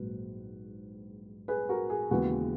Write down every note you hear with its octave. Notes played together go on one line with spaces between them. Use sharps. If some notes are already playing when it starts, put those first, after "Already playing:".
Already playing: A#1 G#2 F#3 B4
G#4 B4
F#4 A#4
G#4
D#2 C#3 E3 G#3 B3 F#4